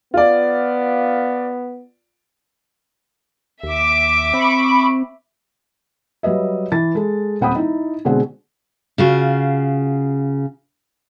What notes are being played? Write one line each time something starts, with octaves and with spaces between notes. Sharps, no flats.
B3 F4 D5
D#2 E5 D6
C4 B5 C#6
F#3 G3 B4 D#5 E5
E3 A6
G#3 A4
D#1 C4 F#5 G5 B5 D#6
D#4 E4
B2 D3 G#3 C4 G#4 F#5
C#3 F4 F#4